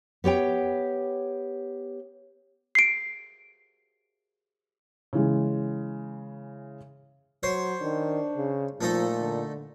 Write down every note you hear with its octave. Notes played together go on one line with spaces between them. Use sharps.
B3 G4 C#5 G5
C7 D7
C#3 E3 G#3
F#3 C5 C#5 C6
D#3 D4
C#3
A#2 F3 A3 D#4 A4
D3